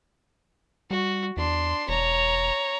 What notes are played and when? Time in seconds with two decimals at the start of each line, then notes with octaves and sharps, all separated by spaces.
0.91 G3 F#4
1.37 E2 D4 C6
1.89 E1 C#5 A#5